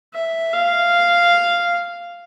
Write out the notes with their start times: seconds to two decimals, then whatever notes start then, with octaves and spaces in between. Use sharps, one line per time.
0.14 E5
0.53 F5